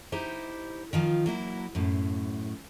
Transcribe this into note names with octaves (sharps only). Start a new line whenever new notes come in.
D#4 E4 G4 C5
D#3 F3 F4
F#3 A#3 E4
F#2 A2